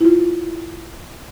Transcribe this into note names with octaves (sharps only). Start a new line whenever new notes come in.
E4 F4